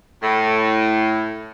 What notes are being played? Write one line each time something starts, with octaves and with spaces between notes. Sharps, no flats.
A2